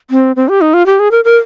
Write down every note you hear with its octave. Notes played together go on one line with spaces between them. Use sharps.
C4
C4
G4
D#4
F4
G4
G#4
A#4
A#4